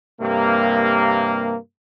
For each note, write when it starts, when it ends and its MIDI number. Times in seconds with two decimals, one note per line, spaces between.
0.21 1.56 43
0.21 1.56 48
0.21 1.56 58